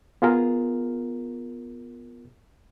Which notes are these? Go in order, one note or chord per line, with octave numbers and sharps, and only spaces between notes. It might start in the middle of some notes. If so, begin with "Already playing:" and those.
B3 F4 G#4 A#4